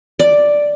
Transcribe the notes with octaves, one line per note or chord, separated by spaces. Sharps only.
D5